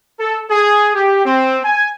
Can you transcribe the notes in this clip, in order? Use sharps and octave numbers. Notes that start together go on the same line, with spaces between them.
A4
G#4
G4
C4
G#5